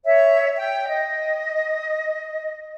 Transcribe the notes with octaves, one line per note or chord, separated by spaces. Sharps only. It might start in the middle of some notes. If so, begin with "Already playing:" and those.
C#5 E5
G5
D#5